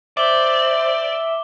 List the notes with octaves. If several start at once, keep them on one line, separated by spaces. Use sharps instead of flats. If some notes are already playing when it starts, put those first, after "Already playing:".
C5 D5 E5 D6 G7